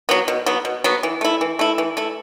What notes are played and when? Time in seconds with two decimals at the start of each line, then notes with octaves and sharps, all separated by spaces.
0.09 F#3 B3
0.28 B2
0.46 F#3 B3
0.65 B2
0.84 F#3 B3
1.03 E3
1.21 A3 E4
1.41 E3
1.59 A3 E4
1.78 E3
1.97 A3 E4